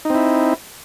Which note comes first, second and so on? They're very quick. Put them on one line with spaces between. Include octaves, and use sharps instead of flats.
D#4 C4 E4